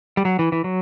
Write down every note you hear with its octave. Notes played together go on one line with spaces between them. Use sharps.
G3
F#3
E3
E3
F#3